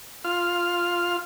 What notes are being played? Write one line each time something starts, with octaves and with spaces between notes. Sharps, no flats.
F4 F6